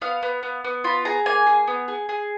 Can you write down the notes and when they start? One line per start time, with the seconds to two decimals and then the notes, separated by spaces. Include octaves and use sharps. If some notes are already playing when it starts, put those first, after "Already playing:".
0.02 B3 F5
0.23 B3
0.43 B3
0.64 B3
0.84 F4 B5
1.05 G#4 A#5
1.26 A#3 G#5
1.47 G#4
1.68 B3
1.88 G#4
2.09 G#4